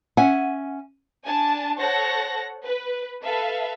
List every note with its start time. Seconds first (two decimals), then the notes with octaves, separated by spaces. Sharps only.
0.17 C#4 E5 F#5 G#5
1.26 D4 G#5 A5
1.79 A4 C5 C#5 F#5 A5 A#6
2.64 B4
3.23 A4 B4 E5 F5